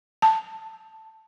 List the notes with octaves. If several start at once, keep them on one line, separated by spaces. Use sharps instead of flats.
A5